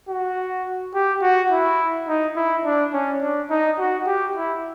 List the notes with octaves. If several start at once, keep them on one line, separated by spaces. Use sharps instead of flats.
F#4
G4
F#4
E4
D#4
E4
D4
C#4
D4
D#4
F#4
G4
E4